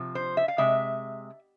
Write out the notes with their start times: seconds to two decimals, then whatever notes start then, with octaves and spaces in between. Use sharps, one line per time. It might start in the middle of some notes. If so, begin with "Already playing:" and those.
Already playing: C3 F3
0.15 C5
0.37 E5
0.48 F5
0.58 C3 G#3 E5